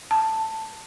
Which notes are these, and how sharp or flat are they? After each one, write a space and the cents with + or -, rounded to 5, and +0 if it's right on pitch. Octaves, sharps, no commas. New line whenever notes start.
A5 +10